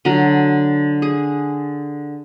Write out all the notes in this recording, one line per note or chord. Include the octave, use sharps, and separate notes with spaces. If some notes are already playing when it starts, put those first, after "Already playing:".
D3 F#3
G#4